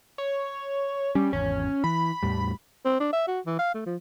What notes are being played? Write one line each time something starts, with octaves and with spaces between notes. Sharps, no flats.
C#5
G3 C#4
G#1 E2 C#4
E3 B5
E2 A2 G3
C4
D4
E5
F#4
E3
F5
A3
F3